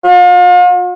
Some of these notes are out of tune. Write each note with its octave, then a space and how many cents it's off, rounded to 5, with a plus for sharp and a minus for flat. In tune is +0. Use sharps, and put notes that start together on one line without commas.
F4 +40